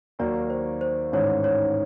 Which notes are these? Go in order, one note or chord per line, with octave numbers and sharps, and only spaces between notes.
D#2 D#3 F#3 A#3 D5
C5
C5
A1 G#2 D#3 C#5
C#5